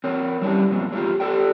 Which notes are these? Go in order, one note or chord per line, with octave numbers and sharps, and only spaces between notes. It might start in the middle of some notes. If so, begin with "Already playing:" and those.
C4 A#4 C#5
F#3 G3 C#4 D4 E4 G4
F2 A#2 F#3 C4
F#3 G#3 E4 F4 G4
G4 A4 D5 G5